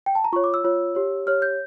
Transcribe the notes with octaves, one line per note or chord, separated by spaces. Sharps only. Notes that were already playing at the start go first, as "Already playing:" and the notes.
G5
A5
A#5
F4 C#5 C#6
D6
E6
F4 C#5
G4 C#5
G4 C#5 F6
G6